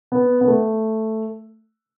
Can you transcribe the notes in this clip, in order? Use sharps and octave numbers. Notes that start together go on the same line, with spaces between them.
B3
B3
A3